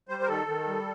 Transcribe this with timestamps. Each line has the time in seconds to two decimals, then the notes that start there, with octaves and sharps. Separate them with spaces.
0.08 G3 C5
0.23 A#4
0.28 D#3 A4
0.48 D#3
0.67 G3